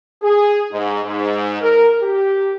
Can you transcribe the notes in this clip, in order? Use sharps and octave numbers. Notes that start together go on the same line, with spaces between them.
G#4
G#2
G#2
A#4
G4